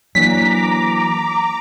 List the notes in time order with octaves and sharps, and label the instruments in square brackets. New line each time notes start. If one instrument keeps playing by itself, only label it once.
[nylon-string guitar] E3 A#3 D4 [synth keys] F#3 [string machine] A#5 D6 [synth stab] B6